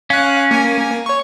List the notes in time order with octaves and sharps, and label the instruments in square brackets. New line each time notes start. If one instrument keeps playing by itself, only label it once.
[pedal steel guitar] C#4 [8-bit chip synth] F5 F#6
[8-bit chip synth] A#3 G#5
C#5 C#6